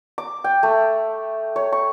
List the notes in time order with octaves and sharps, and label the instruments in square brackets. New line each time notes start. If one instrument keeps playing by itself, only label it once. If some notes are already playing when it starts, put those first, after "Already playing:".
[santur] D6
G5
A3
C#5
C#6